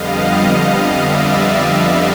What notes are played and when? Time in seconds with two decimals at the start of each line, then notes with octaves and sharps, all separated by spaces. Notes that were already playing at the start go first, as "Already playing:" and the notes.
Already playing: F2 D3 G3 B3 D#5 F5
0.88 D5 E5